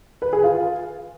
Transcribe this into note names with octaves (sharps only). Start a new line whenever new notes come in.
B4
G#4
F4